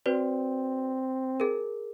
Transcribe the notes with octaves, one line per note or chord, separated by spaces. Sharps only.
C4 F#4 B4 D5
G#4 A#4